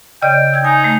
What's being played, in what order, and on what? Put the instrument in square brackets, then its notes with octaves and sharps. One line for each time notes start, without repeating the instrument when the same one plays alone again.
[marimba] C#3 D5 D#5 [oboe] G5
[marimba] E6 G6 G#6
[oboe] D#4 [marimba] G#5
[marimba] A3